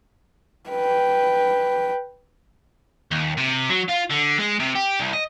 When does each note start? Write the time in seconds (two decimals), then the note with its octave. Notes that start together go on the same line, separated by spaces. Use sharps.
0.70 B4 G5
3.11 D#2
3.37 C3
3.70 F#3
3.89 F4
4.11 D3
4.39 G#3
4.60 C3
4.76 G4
5.00 C2
5.13 D#5